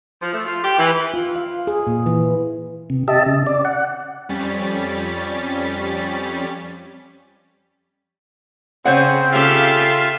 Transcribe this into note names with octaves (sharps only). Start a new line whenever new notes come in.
F3
A3
F4
G4
E3
F4
F5
G#4
A#2
E3
C3
G4 D#5 E5 A5
C#3
D5
F#5
F2 G3 C#4 A6 B6
C#3 C4 C5 C#5 F#5
C#3 F4 G4 A4 E5 F5